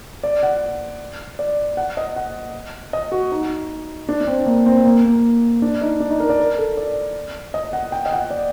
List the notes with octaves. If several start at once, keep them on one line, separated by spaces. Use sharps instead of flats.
D5
F#5
D5
F#5
D#5
F#5
D#5
F#4
D#4
D4
D4
C4
A#3
C4
A#3
A#3
D4
D#4
D4
D#4
A#4
D5
A#4
A4
D5
D#5
F#5
G5
D#5
F#5
D5